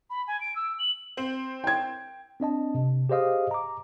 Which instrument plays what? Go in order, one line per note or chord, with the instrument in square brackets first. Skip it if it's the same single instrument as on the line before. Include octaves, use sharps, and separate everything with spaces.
[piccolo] B5
G#5
D7
E6
F#7
[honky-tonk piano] C4 F#7
[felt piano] G5 G#6
[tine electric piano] C4 D4 D#5 A5
C3
G4 G#4 C5 D#5 F5 D#6
A#5 D6